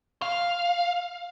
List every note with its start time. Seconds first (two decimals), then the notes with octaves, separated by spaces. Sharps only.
0.22 F5